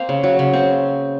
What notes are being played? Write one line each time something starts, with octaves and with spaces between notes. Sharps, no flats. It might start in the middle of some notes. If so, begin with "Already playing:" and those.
Already playing: A#3 C4 F5
C#3
F#3
C#3
C4